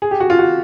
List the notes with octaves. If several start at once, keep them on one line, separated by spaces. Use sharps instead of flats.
G#4
G4
F#4
F4
F#4